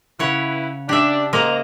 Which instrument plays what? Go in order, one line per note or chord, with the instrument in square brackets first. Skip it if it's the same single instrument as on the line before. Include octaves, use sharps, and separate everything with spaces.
[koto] C#3 C#5 F#5 [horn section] E4 B4
[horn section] D4 [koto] G4 E5
[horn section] G#2 A#5 [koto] G#3 A#3